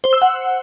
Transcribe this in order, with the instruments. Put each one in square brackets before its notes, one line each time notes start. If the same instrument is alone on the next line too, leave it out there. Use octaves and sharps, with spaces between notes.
[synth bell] C5
E6
F#5